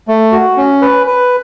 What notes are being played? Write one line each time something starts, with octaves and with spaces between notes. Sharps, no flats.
A3
F#4
C#4
B4
B4